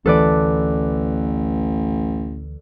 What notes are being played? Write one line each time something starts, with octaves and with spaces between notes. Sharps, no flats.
A1 D2 E3 A4 B4 D5